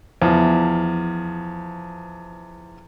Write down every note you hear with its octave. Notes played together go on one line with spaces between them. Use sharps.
E2 F3